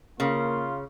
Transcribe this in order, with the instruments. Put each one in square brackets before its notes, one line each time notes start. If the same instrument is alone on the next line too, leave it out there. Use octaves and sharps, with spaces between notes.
[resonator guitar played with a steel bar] C#3 [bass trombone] A#3 [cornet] F4